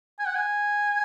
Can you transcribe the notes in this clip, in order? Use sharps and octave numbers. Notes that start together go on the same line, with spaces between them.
G#5
F#5
G#5